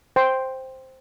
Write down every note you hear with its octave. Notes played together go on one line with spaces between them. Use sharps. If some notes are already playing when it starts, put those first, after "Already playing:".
C5 G5 C6